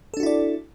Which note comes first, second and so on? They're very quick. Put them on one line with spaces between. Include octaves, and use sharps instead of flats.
A4 D4 F#4 E4 D5